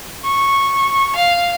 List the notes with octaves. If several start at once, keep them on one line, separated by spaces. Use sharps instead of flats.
C#6
F5